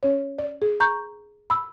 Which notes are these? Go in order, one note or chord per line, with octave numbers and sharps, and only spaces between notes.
C#4 C#5
D5
G#4
A#5 C#6 G6
B5 E6